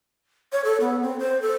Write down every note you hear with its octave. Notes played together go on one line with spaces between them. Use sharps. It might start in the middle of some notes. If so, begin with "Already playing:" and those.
C#5
A4
B3
C4
C5
A4